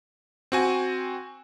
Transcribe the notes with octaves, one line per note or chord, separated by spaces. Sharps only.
C4 F#4 G#5